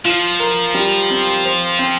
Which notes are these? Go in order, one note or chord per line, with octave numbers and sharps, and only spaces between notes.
F3 F4
A#4
G3
C4
C5
C4